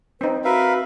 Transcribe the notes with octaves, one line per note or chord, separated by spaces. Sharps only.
C4 D#4 B4
F#4 A#4 B4 E5 F5